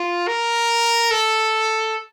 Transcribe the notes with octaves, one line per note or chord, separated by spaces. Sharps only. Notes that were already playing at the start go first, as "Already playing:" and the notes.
Already playing: F4
A#4
A4